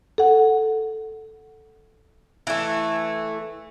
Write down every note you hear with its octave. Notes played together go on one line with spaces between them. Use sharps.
A4 F#5
E3 A3